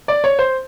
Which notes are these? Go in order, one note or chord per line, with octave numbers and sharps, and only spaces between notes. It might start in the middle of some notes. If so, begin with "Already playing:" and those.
D5
C#5
C5